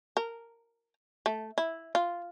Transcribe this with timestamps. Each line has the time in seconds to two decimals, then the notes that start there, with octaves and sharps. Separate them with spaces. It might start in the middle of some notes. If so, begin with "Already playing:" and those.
0.17 A#4
1.26 A3
1.58 E4
1.95 F4